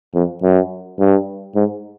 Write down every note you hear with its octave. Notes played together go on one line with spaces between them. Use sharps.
F2
F#2
G2
G#2